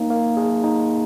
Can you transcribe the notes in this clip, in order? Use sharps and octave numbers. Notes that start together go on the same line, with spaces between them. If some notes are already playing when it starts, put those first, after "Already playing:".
Already playing: A#3 D#4
A#3
G#4
D#4